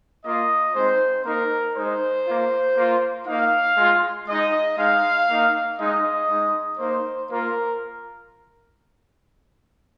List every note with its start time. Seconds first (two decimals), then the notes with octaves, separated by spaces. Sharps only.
0.24 A#3 F4 D#5
0.75 G#3 C4 D#4 C5
1.25 A#3 D#4 A#4
1.75 G#3 D#4 C5
2.26 A#3 F4
2.76 A#3 F4
3.26 A#3 D#4 F5
3.77 G#3 F4
4.27 G#3 D#4 D#5
4.78 G#3 D#4 F5
5.28 A#3 D#4
5.78 G#3 D#4 D#5
6.29 G#3 D#4
6.79 A#3 D#4 C5
7.30 A#3 F4 A#4